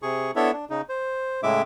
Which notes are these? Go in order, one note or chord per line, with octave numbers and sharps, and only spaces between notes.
C3 G#4 C#6
B3 D4 E4 A4 C#5 E5
D4
C#3 D#4
C5
A2 C#3 G#3 E4 E5 D6